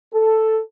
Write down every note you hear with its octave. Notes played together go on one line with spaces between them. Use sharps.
A4